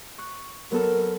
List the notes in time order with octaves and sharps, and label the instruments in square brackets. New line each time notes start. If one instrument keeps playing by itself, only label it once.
[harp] C#6 F#6
[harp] F#3 B3 A4 [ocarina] A#4